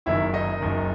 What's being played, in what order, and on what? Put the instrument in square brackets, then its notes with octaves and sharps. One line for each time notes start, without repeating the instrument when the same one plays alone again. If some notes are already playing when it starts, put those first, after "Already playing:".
[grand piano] F#1 F#2 D#3 E4 E5
D#4 D#5
F#1 F#2 D#3